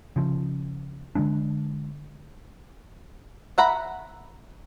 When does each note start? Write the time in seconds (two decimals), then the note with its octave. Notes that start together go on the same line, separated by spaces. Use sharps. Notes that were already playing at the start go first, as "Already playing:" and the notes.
0.16 C#3 F3
1.15 D3 E3 G#3 D4
3.58 E5 F#5 A#5 B5